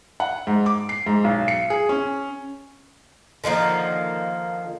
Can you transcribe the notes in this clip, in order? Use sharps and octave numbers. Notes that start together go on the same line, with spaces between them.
F#5
G#2
D6
C7
G#2
B1
C#7
G#4
C#4
D3 D#3 F3 A#3